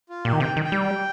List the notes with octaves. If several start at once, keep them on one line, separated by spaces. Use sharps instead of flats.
F4
A#2 G4
D#3
C3 G5
D#3
G5
G3